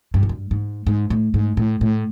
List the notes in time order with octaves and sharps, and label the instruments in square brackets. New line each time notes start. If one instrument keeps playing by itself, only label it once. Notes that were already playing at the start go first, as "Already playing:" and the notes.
[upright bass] G2
F#2
G2
G#2
G#2
A2
G#2
A2
A2